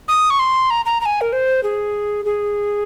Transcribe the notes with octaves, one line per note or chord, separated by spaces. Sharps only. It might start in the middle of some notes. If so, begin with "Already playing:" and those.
D#6
C#6
C6
A#5
A#5
A#5
G#5
A#4
C5
G#4
G#4